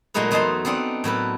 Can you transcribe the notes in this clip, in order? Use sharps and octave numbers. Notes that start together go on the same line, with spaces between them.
A#2 F#3 G#3 A3 D#4 B4
E2 F#3 D#4 C5 A5 C6
B3 C4 D4 D#4 F#5
A2 F#3 A4 B4